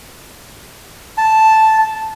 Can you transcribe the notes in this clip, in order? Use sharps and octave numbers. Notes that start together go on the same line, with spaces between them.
A5